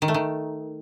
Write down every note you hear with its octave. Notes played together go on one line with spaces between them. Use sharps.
D#3
A3
D#3